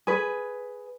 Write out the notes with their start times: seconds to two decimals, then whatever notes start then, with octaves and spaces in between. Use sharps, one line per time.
0.07 G#4 B4